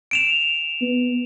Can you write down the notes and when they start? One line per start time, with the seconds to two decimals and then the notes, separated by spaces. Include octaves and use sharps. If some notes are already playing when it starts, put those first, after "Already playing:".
0.11 D7 E7 F7
0.81 B3